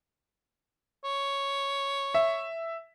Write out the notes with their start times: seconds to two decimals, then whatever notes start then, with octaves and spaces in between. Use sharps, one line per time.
1.04 C#5
2.14 E5